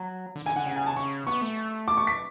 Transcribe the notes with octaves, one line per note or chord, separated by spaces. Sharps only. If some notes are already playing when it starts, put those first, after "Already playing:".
Already playing: F#3
D3
D3 G#5
D3 F#5
C#3 F#5
G#5
A5
C#3 C#6
B3 C#6
A3
D6
C#6
B6